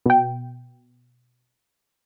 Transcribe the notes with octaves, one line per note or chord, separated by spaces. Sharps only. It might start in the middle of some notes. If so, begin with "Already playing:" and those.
B2 G5